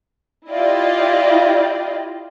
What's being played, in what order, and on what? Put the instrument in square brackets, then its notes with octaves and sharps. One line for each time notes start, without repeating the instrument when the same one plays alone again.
[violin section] E4 F4 G4 D5 D#5